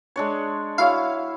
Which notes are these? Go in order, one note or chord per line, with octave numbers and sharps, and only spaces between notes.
G#3 D4 C#5
E4 F#4 C#5 F5